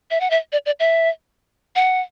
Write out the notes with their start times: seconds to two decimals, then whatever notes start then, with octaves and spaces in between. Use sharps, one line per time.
0.11 E5
0.20 F#5
0.30 E5
0.52 D5
0.66 D5
0.80 E5
1.76 F#5